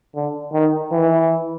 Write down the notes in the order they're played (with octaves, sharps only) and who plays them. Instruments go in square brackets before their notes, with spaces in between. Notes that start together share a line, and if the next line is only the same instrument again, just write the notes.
[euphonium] D3
D#3
E3